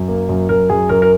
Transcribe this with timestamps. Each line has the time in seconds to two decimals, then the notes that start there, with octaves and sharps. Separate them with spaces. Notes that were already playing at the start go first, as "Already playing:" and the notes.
Already playing: F#2
0.08 A#3
0.29 F#2
0.49 F#2 A#4
0.70 F#2 G#4
0.89 F#2 A#4
1.02 A#4